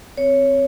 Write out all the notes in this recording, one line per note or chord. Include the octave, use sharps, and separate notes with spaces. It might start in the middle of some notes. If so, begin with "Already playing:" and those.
C4 C#5